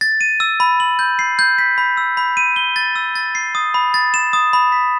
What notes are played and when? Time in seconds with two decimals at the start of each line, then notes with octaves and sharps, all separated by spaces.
0.01 A6
0.21 D#7
0.40 E6
0.60 B5
0.80 F#7
0.99 G6
1.19 C7
1.39 G6
1.58 B6
1.78 B5
1.97 E6
2.17 B5
2.37 D#7
2.56 G7
2.76 A6
2.96 E6
3.15 A6
3.35 C7
3.55 D#6
3.74 B5
3.94 A6
4.14 E7
4.33 D#6
4.53 B5
4.72 B6